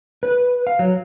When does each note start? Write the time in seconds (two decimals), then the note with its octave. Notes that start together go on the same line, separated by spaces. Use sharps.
0.23 B4
0.67 F5
0.79 F#3